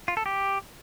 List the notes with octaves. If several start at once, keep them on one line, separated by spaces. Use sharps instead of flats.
F4
A4
G4